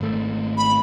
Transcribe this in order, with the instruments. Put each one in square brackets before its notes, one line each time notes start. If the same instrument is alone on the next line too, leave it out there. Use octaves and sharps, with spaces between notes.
[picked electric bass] G#1 A3
[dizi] B5